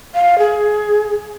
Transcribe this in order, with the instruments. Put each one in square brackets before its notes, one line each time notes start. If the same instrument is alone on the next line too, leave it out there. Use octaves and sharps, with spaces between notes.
[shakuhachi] F5
G#4